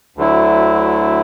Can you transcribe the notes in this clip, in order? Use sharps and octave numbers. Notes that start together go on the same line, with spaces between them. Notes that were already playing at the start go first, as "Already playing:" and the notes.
D2 D3 F#3 A3 E4